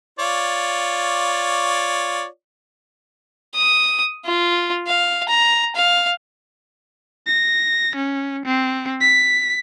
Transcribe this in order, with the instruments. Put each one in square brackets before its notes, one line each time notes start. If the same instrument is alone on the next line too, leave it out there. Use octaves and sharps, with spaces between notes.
[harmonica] F4 C#5 D5
[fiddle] D#6
F4
F5
A#5
F5
[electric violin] A#6
C#4
C4
B6